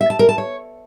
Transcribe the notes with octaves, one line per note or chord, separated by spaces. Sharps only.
E5
A5
A#4
A5
C#5